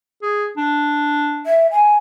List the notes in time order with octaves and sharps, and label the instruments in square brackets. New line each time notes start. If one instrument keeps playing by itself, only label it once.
[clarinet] G#4
D4
[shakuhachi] E5
G#5